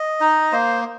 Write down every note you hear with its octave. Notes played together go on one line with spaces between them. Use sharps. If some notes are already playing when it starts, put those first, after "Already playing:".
Already playing: D#5
D#4
A#3 C5